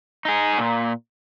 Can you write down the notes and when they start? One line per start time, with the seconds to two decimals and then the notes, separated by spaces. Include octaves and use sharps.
0.25 D#4 G#4
0.58 A#2